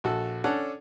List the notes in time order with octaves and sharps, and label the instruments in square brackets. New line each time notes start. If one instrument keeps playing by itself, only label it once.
[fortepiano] A#1 F#4 A4
C#4 D4 A4 F#5